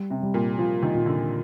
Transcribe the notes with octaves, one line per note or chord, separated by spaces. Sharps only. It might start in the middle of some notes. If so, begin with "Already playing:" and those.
Already playing: G3
C3
G3
A#2
F3 F4
D#3
A#2
D3